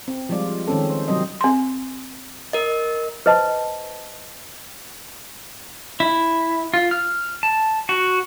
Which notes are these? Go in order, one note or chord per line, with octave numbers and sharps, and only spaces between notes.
C4
F3 G3 G#3 F4 D5
D#3 G#3 C4 C#4 A4
C5
C3 F#3 G3 C4 C5 D#5
C4 C6
A#4 D#5
B4 C5 D#5 A5
E4
F4
F6
A5
F#4